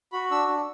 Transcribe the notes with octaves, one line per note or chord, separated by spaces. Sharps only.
F#4 B5
D4 E6
D4